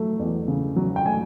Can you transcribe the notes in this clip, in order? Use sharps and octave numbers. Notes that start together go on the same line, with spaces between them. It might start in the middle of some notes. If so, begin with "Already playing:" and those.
Already playing: F#3 A3
E2
C#3
F#3
G5
A3 G#5